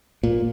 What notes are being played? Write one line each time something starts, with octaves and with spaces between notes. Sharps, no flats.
A#2